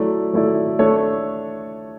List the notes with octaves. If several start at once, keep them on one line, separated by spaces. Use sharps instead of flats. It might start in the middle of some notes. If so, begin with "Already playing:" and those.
Already playing: F#3 A3 E4 A4 D5
F#3 A3 E4 A4 D5
A3 D4 A4 C#5